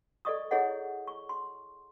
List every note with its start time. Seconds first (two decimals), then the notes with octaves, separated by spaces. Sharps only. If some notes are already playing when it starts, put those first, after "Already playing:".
0.25 A4 D5 D#5 C#6 D#6
0.51 E4 G#4 A4 C#5 D#5 F#5
1.08 C#6
1.29 C6